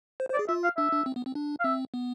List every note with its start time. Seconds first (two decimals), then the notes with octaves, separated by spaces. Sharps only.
0.20 C5
0.30 C5
0.34 D5
0.39 G#4
0.48 F4 E5
0.64 F5
0.77 D4 E5
0.92 D4
1.06 C4
1.16 B3
1.26 C4
1.35 D4
1.60 F5
1.64 C4 E5
1.94 B3